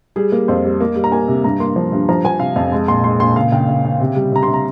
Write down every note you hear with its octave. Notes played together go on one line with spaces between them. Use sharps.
G3 G#4
A#3
F2 C5
G3
A#3
G3
A#5
A#3 G#5
C3
G2 A#5
A#3 C6
F3
G2
F3 A#5
F3 G#5
C3 F5
F2 F5
G#3
A#2 C6
G#3 C6
A#2 C6
C#3 F5
C#3 G5
C#3
C#3
C3
G3
C3 A#5
C6
C3
A#5